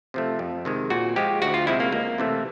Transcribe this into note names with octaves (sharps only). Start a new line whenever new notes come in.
C3 F3 A3
F2
C3 D#3 G#3
A#2 F#4
F3 G#3 G4
D2 F#4
F4
C3 F3 G#3 E4
A#3
C#2 A#3
C3 E3 A3